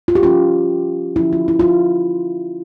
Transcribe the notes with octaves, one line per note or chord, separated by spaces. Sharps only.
F4
G4
F3 C#4 F4
D3 F3 C#4 E4
F4
E4
F4